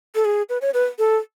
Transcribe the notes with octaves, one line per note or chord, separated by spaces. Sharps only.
A4
G#4
B4
C#5
B4
A4